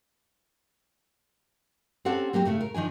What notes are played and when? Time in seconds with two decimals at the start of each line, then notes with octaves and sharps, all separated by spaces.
2.05 C4 C#4 G4 A4 F#5
2.33 F#3 A#3 C4 G4
2.45 A2 C#3 A3
2.61 A#4
2.74 D#3 F3 D4 G#5